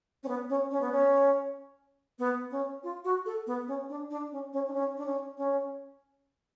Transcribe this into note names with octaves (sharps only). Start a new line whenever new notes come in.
C#4
B3
C#4
C#4
B3
C#4
B3
C#4
F4
F#4
A4
B3
C#4
D4
D4
C#4
C#4
D4
C#4
D4
C#4
C#4